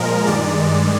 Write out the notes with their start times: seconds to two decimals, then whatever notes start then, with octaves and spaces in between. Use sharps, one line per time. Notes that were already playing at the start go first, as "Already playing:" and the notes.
Already playing: A#2 F3 G#3 A#4
0.26 G2 D#3 G#3 D5